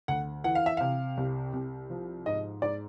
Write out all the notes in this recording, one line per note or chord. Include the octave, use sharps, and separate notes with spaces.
D2 F#5
E3 F#5
F5
E5
C3 F5
C2
C2
F3
G#2 D#5
G#2 D5